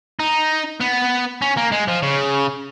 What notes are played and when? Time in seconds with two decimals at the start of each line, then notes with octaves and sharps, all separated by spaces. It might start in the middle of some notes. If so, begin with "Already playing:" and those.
0.19 D#4
0.81 B3
1.42 C#4
1.57 A#3
1.72 G#3
1.88 F3
2.03 C#3